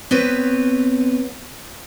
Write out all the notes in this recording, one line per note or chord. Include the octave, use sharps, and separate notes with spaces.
B3 C4 B4 C#5